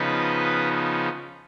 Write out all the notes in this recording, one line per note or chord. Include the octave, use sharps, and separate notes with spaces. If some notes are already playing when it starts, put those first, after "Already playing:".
Already playing: C#3 F3 B3 D#4 B4 D#5